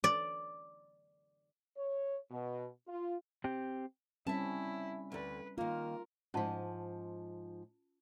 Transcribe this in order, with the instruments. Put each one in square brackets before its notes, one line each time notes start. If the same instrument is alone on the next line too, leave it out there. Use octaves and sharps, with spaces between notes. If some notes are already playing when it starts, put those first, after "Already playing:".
[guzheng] D5
[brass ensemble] C#5
B2
F4
[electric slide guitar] C4 G4
[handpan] G3 C4 C#4 [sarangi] E4 [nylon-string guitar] E5 A5
[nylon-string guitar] D2 D5 [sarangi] B4
[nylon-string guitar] D#3 A#3 [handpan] F4 [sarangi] A#4
[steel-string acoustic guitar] G#2 F3 [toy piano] C#4 F4 A5